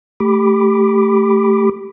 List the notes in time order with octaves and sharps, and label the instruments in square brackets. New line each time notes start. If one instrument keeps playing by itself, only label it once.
[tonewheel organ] A3 G4 B5 D6